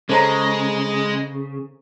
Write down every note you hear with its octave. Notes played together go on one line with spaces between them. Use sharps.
C#3 G#3 A4 C5 C#5 D#5 A5 A#5